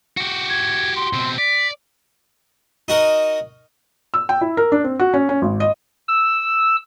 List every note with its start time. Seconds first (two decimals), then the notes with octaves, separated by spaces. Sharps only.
0.17 F#4 G4
0.50 G#6
0.96 C6
1.13 B2 C4
1.38 D5 B6
2.88 D#4 F#4 A#4
4.14 E6
4.29 G5
4.41 E4
4.57 A#4
4.72 D4
4.84 C4
4.99 F#4
5.14 C#4
5.29 C#4
5.42 G#1
5.60 D#5
6.08 E6